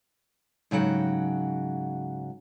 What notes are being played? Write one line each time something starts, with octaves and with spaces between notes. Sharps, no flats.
G#2 C#3 F#3 F#5 G5